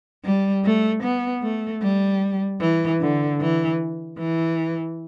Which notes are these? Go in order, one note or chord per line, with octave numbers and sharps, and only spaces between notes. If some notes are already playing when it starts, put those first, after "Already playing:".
G3
A3
B3
A3
G3
E3
D3
E3
E3